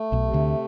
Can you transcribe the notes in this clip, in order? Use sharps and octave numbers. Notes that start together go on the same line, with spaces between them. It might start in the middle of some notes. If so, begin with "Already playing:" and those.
Already playing: A3
B1 B2
C3
D2 D3